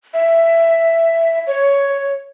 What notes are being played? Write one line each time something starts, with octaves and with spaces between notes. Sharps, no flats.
E5
C#5